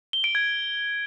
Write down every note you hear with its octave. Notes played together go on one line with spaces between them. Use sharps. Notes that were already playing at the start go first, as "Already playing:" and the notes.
G7
D7
G#6